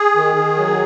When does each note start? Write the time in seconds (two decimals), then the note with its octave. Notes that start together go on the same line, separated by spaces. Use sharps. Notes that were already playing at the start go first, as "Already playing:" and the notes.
Already playing: G#4
0.15 D#3
0.36 D#3
0.58 F#3